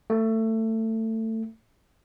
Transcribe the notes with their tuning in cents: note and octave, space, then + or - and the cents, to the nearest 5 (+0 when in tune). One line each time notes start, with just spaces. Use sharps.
A3 +20